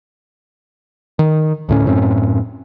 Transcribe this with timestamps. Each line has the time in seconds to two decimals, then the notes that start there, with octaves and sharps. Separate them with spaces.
1.19 D#3
1.69 D2 A2 C#4
1.86 F#2 A2 C4 C#4